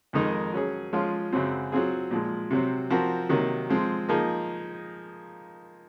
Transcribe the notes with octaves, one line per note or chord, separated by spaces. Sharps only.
F2 D#3 G#3 D#4 A#4
F#3 C#4 G#4
F3 G#3 C#4 F4
F#2 C#3 F#3 C4
F#3 C4 F4 G#4
A#2 F3 G#3
C3 F#3 C4
F3 C4 F#4 A#4
C3 D#3 F#3 A#3
F3 G#3 C4
F3 A#3 D#4 G#4